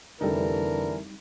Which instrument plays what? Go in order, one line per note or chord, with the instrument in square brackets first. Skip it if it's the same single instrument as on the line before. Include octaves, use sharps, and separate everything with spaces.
[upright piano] F1 A4 [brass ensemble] D3 E3 [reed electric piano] G3 D#4 [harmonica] A#4